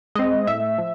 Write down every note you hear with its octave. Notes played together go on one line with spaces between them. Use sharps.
G#3 C4 D#5
A2 E5
F3